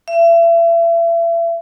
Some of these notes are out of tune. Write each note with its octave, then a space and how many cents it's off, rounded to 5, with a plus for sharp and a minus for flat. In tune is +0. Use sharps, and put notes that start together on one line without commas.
E5 +35